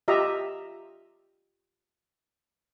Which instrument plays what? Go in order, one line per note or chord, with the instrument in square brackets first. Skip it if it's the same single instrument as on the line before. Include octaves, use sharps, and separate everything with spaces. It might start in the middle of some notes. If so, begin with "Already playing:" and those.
[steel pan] F4 G4 D#5 E5 A#5